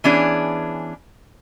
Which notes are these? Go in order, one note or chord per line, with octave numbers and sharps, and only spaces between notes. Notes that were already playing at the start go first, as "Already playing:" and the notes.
E3 B3 C#4 D4 G#4